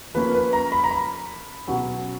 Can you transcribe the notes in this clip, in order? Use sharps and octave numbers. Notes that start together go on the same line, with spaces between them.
F3 A#3 C#4 B4
B4
A#5
B5
A#5
B5
B2 F#3 C#4